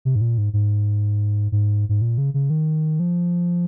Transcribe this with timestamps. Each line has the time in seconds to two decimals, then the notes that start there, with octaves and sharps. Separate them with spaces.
0.05 C3
0.16 G#2
0.21 A#2
0.38 G#2
0.53 G#2
1.52 G#2
1.89 G#2
2.02 A#2
2.18 C#3
2.34 C#3
2.50 D#3
3.00 F3